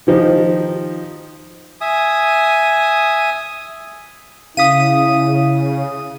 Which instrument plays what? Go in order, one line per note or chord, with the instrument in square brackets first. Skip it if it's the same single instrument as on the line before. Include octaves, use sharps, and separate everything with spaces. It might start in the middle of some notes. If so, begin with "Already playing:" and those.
[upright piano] D#3 F3 D#4 G4
[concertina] E5 G#5 D#6
[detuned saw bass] C#3 [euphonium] E4 [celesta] F5 B6 [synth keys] D#6 D#7